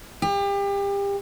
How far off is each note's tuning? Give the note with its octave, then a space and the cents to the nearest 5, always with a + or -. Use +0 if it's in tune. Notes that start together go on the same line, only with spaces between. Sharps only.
G4 +30